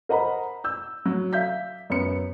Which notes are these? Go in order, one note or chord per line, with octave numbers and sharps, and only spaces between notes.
A#4 C5 D#5 F#5 A#5 B5
E6 G6
F#3
E5 F5 G6 B6
F#2 B3 C#7